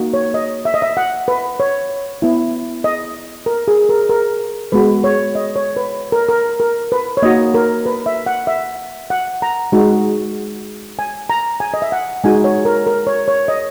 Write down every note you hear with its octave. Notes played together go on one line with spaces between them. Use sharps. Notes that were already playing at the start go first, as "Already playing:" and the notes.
Already playing: A#3 D#4 F#4
C#5
D#5
E5
D#5
E5
F#5
B4
C#5
B3 E4
D#5
A#4
G#4
A#4
A#4
G#3 B3 F#4 B4
C#5
D#5
C#5
B4
A#4
A#4
A#4
B4
C#5
A#3 D#4 F#4 D#5
A#4
B4
E5
F#5
E5
F#5
A#5
G#3 D#4 F#4
G#5
A#5
G#5
D#5
E5
F#5
G#3 D#4 F#4 G#5
C#5
A#4
A#4
C#5
C#5
D#5